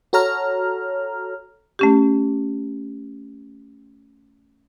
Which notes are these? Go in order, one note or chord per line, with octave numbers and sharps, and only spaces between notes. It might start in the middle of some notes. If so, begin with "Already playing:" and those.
F#4 A4 C#5 A#5 F6
A3 C#4 G4